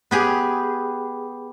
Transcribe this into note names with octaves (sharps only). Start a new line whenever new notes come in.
B3 G4 G#4